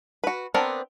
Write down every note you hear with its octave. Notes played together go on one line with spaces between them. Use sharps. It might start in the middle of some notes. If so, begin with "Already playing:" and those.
F#4 B4
B3 C4 D4 A#4